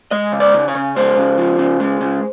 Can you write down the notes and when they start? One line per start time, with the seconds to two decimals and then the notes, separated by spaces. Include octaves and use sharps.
0.11 G#3 D#5
0.32 C#3
0.40 D5
0.54 C#3
0.68 C#5
0.75 C#3
0.96 G#3 C5
1.17 C#3
1.38 F3
1.59 C#3
1.80 G#3
2.01 C#3